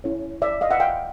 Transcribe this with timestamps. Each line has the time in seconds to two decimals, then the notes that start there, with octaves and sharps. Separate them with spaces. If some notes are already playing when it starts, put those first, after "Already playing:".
0.04 C#4 E4 A4 C#5
0.42 D5 E5
0.61 D#5 F5
0.71 E5 F#5
0.80 F5 G5